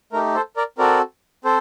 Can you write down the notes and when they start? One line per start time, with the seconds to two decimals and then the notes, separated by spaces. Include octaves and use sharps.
0.12 A3 D#4 G4 A#4
0.35 A4 C5
0.56 A#4 D5
0.78 C4 F#4 A4 A#4 D5
1.44 C4 A4 C5